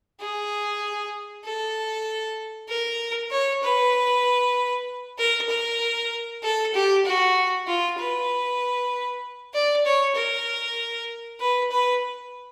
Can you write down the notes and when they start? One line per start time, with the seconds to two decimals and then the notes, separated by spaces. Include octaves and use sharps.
0.20 G#4
1.45 A4
2.69 A#4
3.31 C#5
3.63 B4
5.18 A#4
5.49 A#4
6.43 A4
6.74 G4
7.05 F#4
7.67 F4
7.99 B4
9.54 D5
9.85 C#5
10.15 A#4
11.40 B4
11.71 B4